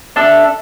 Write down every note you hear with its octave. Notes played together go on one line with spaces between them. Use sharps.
D4 A4 E5